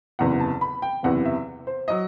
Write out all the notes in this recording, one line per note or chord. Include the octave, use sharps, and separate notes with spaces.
F#1 E2 C3 E3 F#5
A5
B5
G5
F#1 E2 C3 E3 F#5
E5
C5
F#3 D#5